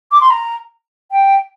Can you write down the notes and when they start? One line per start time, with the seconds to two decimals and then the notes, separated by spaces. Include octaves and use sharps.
0.11 D6
0.21 C6
0.30 A#5
1.11 G5